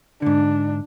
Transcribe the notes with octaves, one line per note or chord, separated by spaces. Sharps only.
G#2 D3 D4